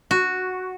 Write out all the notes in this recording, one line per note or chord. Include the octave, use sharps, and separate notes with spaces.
F#4